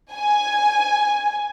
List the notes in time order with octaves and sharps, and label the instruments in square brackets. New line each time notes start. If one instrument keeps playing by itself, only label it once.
[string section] G#5